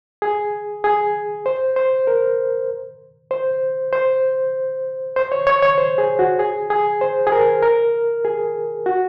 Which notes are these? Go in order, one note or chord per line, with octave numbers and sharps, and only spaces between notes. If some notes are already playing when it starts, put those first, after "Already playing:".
G#4
G#4
C5
C5
A#4
C5
C5
C5
C#5
C#5
C#5
C5
G#4
F#4
G#4
G#4
C5
G#4
A#4
A#4
G#4
F#4